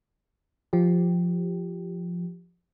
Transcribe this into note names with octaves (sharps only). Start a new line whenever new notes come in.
F3 G4